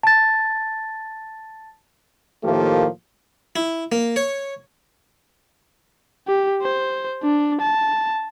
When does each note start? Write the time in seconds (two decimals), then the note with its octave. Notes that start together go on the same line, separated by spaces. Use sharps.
0.03 A5 A6
2.44 A2 D#3 F3 A3 A#3 G4
3.56 E4
3.92 A#3
4.16 C#5
6.28 G4
6.62 C5
7.23 D4
7.61 A5